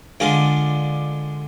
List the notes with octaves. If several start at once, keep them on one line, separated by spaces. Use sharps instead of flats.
D3 G#3 D4 F4